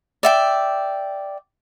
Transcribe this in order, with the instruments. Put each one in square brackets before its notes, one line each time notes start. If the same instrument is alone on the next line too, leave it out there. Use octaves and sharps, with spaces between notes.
[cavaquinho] D5 E5 G5